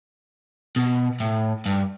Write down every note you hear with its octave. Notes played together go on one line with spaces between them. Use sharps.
B2
A2
G2